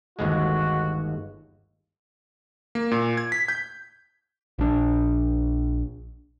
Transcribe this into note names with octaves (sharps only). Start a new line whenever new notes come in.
G1 D#2 G#3 F#4
A#3
A#2
G#6
B6
G6
A#1 D4